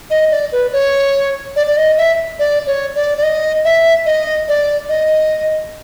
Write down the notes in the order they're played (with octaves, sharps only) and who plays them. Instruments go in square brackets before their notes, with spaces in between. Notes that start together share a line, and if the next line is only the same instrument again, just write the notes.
[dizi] D#5
D5
B4
C#5
D5
D5
D#5
E5
D5
C#5
D5
D5
D#5
E5
D#5
D5
D#5